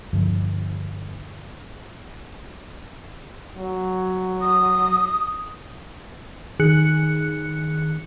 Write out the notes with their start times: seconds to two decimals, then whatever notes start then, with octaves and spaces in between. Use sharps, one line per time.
0.13 G2 D3 F3
3.57 F#3
4.41 D#6
6.60 D#3 G#4 F#6 C#7